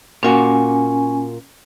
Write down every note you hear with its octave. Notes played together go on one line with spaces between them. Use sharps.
A#2 A#3 C#4 F#4 G#5